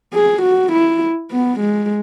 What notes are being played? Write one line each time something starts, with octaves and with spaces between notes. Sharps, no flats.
G#4
F#4
E4
B3
G#3